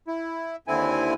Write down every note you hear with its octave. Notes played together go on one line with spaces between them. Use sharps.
E4
D#2 D3 C4 E4 G#5